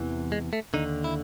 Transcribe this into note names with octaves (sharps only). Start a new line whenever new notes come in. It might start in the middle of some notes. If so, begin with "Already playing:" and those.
Already playing: E2 C3 E3
G#3
A3
D#2 D3 D#4
E4